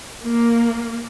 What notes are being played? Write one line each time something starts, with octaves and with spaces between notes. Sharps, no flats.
A#3